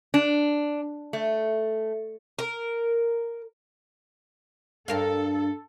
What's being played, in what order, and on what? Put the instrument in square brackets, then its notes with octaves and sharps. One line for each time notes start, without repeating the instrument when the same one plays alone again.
[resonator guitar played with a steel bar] D4
A3
[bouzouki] A#4
[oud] G2 A#4 F5 [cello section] A4